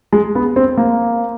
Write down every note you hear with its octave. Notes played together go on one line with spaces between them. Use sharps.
G#3
B3
C4
A#3